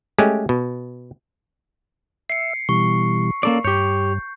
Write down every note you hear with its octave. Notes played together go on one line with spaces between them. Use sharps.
G#3 A3 C#4 G4
B2
E5 C7 C#7
B2 E3 G3 C#6
A#3 C#4 A4 D5
G2 G4 C#5 G6